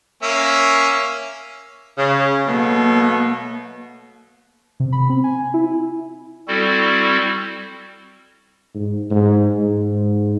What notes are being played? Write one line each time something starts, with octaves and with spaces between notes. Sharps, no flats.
A#3 C#4 E5
C#3
B2 F#3 A3 A#3
C3
B5
C4
G#5
E4
G3 C4 E4 F#4 A4
G#2
G#2
G#2